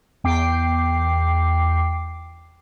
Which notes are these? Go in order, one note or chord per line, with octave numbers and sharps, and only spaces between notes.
E2 G5 D6 C7